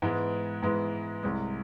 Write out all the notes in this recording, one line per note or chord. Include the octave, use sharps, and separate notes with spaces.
G#2 E3 G#3 B3
G#2 E3 G#3 B3
C2 C3 G#3